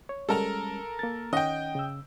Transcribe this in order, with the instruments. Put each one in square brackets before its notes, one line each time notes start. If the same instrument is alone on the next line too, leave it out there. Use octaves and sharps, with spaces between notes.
[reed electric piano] C#5
[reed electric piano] G3 G#3 C#4 [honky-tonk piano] A4 A#4 A#5
[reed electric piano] A#3 A6
[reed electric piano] D#3 C#4 F#5 [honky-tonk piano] D#5 G5
[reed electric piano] C#3 E6